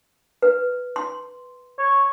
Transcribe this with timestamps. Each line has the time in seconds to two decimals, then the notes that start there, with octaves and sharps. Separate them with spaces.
0.42 B4
0.96 C6
1.79 C#5